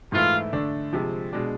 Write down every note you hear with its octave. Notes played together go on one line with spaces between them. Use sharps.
G#2 E3 A3 E4 F4
D3 A3 D4
C3 F3 G#3
B2 G#3 D4